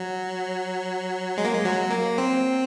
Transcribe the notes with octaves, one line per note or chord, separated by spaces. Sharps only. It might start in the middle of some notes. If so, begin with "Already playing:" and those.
Already playing: F#3
G#3
A#3
G#3
F#3
A#3
C4